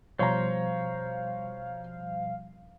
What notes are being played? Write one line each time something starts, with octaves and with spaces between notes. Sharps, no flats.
B2 F3 G3 C5 C#5 F5 A#5 C6